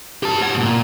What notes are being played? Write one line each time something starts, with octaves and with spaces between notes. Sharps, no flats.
G4 A5
A2 F#5
A#2